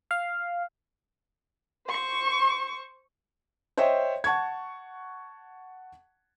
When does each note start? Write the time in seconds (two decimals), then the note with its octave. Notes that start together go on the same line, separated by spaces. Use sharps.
0.11 F5
1.87 C5 C#6
3.77 C5 C#5 D#5 E5 G5
4.24 F#5 A5 C#6 G#6